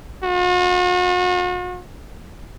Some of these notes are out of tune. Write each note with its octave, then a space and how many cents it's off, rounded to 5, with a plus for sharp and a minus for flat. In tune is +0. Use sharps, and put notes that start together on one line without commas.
F#4 -45